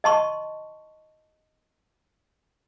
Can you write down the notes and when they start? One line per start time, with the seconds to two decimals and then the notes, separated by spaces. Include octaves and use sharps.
0.04 D#5 A5 C6 C#6